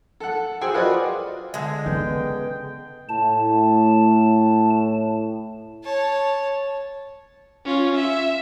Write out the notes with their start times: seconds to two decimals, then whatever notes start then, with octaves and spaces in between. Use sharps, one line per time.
0.20 A4 F#5
0.61 F#4 G#4 C5 G5 G#5 E6
0.74 F4 F#4 B4 C5 D5 D#5
1.54 D3 G#3
1.86 C#3 B3 G5
3.09 A2 A5
5.84 C#5 A5
7.65 C#4 F4
7.95 E5